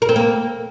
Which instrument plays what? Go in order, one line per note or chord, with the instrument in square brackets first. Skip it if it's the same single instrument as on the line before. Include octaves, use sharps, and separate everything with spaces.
[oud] A#4
C4
A#3